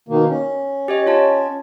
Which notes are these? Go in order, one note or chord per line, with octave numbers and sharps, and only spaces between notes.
B2 D#3 A#3
C#4
G4 C#5 D#5
F4 C#5 A5